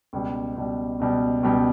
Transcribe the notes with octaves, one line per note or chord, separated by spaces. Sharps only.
C#2 B2 G3
C#2 B2 G3
C#2 B2 G3
C#2 B2 G3